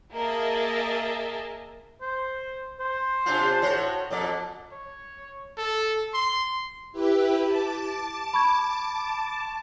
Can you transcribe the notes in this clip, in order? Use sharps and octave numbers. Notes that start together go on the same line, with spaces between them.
A#3 G#4 A#4 D#5 E5 A5
C5
C5
C3 D4 F4
A2 F#4 C#5
F2 B2 D5
C#5
A4
C6
E4 G4 B4
A5 D6
B5 C#6 G#6